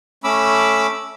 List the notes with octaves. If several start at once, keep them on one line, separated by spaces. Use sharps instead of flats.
A3 C#4 B5 D6 E6